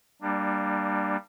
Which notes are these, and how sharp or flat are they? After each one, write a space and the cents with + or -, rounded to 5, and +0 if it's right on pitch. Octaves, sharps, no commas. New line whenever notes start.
G3 +0 A#3 +0 D4 +25